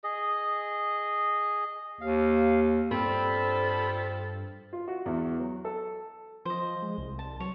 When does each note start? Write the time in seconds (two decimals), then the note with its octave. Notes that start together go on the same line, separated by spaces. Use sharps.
0.04 G#4 D#5
2.01 D#2 F5
2.91 G2 F3 G3 C4 A4 B5
4.73 F4
4.88 F#4
5.06 E2
5.39 F#3
5.65 A4
6.45 F3 C5 D#5
6.82 G#3
6.98 C2
7.19 A5
7.40 F#3 C#5